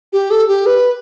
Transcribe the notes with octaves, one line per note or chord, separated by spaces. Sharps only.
G4
A4
G4
B4